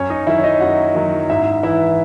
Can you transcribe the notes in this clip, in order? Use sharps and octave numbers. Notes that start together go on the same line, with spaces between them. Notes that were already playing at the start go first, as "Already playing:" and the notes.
Already playing: F#2 C#4 C#5
D#4 D#5
D#3 F#3 E4 E5
C#5
D#4 D#5
F#2 F#4 F#5
D#3 F#3
G#2 E4 E5
E3 E4 E5